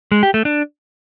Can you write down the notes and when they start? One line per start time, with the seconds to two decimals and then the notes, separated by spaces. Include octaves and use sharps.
0.12 G#3
0.23 G4
0.34 A3
0.45 D4